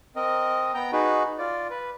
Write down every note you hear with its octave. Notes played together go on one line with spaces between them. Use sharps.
C4 A#4 D#5
B3 G5 A#5 G6
D#4 F#4 G#4 B4
F4 D5
B4